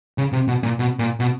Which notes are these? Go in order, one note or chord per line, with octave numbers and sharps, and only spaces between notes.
C#3
C3
B2
A#2
B2
A#2
B2